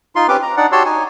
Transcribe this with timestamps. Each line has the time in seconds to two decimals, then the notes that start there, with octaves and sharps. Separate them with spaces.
0.16 D#4 F4 C6
0.28 C4 C#4 G4 B4 D6
0.42 A#5
0.57 D4 D#4 D5 F#5
0.72 F#4 G4 C#5 A5 C6 E6
0.85 D#4 G#5